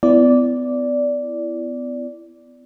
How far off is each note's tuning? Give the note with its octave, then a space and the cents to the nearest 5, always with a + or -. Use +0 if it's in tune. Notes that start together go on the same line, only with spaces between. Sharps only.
B3 +35 E4 +15 D5 -10